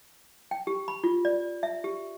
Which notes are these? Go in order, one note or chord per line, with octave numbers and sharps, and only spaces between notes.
G5
G4
B5
F4
D5
E5
G4